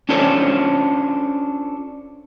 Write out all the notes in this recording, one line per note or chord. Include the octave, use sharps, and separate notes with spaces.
C#4 D4 F4 A4 C5 C#5